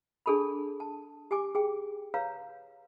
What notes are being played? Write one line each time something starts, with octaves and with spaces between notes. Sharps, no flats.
D4 G#4 A4 A5 B5
A5
G4 G#5 D6
G#4 G5
B4 C#5 F5 A#5